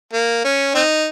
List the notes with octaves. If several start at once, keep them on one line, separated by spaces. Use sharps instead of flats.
A#3
C#4
C4 D#4